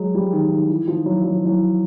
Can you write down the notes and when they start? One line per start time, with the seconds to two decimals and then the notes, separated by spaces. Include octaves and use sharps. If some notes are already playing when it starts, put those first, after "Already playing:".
Already playing: F#3 G#3
0.15 F3 G3
0.33 D#3
0.51 D#3
0.69 E3
0.87 D#3 F3
1.05 E3 F#3
1.24 F#3
1.35 F3
1.46 E3 F#3